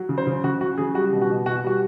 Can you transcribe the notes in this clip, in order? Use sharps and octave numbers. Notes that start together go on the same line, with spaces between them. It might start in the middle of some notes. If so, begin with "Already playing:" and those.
Already playing: F#3
C#3
C5
C#3
C#3 F#4
F#3 F#4
C#3 G#4
G3 F#4
B2
F#4
B2
B2 F#4
G3 F#4